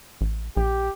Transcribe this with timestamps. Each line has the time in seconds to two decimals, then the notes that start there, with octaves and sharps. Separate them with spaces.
0.21 A1
0.57 A#1 G4